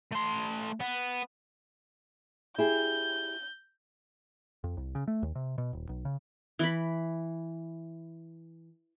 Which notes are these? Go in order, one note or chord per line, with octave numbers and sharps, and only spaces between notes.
A3 C6
B3
E4 G4 G#4 G6
F2
C2
C#3
A3
D#2
C3
B2
D#1
B1
C#3
E3 B5